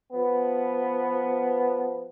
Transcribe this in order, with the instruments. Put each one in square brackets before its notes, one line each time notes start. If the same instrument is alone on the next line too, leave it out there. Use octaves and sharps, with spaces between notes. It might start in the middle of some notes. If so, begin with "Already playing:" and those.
[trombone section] F3 B3